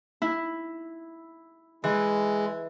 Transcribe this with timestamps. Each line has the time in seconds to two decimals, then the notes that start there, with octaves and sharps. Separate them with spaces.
0.22 E4
1.84 E3 G#3